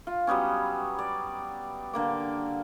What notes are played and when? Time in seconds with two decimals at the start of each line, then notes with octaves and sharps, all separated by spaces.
0.07 F4
0.27 F#3 G3 B3 C#4
0.99 D5
1.93 D3 A#3 D6